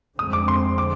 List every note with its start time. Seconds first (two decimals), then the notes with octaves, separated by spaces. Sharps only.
0.18 F2 D3 G#3 C4 D#6
0.33 D6
0.48 C6
0.78 D6